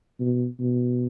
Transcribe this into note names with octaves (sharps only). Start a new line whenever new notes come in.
B2
B2